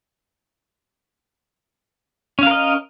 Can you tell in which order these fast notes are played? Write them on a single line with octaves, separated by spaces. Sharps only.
C#4 F5 A#4 D#5